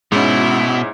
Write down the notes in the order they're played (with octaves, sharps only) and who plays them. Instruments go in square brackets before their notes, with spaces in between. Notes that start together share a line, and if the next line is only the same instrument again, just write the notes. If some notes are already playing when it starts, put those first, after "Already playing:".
[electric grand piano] G#2 C#4 [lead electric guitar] B2 [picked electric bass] G#3 [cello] E4